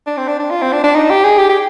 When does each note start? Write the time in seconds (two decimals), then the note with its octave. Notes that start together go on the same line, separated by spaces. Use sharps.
0.07 D4
0.18 C4
0.28 D4
0.40 D4
0.51 F4
0.62 C4
0.73 D4
0.84 D4
0.94 D#4
1.10 G4
1.24 G#4
1.38 G4
1.49 G4